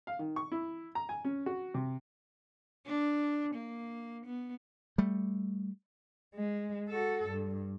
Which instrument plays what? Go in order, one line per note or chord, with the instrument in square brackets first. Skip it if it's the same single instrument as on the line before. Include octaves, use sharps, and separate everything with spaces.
[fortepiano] F5
D#3
C#6
E4
A#5
G#5
C#4
F#4
C3
[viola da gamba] D4
A#3
B3
[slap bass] G3 A3
[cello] G#3
F#4 A4
G2